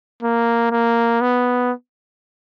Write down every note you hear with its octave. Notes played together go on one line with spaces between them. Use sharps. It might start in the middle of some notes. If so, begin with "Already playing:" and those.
A#3
A#3
B3